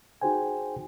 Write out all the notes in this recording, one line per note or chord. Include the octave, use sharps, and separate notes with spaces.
D#4 F#4 G#4 C5 G5 G#5